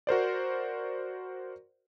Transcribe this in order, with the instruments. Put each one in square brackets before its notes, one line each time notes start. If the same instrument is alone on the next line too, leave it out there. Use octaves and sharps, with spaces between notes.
[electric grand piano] F#4 A#4 C5 D5